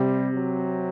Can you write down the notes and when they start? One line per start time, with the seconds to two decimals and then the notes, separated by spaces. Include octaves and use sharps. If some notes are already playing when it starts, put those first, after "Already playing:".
Already playing: C3 G3
0.34 F#3